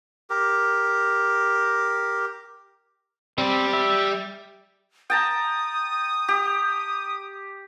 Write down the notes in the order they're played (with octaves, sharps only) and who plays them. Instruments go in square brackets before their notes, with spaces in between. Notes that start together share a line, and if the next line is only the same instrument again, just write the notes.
[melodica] G4 A#4
[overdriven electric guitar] G3 G4 [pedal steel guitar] C4
[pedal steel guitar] E5
[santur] G5 A5 A#5 [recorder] D#6
[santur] G4